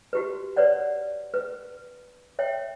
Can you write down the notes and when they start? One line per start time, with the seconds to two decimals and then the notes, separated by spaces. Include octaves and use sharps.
0.13 F#4 G4 B4
0.56 B4 C#5 D5 F#5
1.34 B4
2.39 C#5 E5 G5